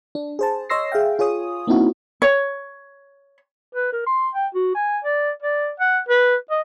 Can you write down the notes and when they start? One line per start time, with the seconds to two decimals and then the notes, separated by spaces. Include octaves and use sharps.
0.15 D4
0.39 G#4 C5 A5
0.69 C#5 D#5 C6 E6 A#6 C7
0.92 G#4 E5 F5 G5
1.19 F4 G#4 C#5 D#6
1.67 A#3 C4 C#4 D#4 E4 F#4
2.22 C#5
3.74 B4
3.93 A#4
4.06 C6
4.34 G5
4.55 F#4
4.75 G#5
5.04 D5
5.42 D5
5.80 F#5
6.09 B4
6.51 D#5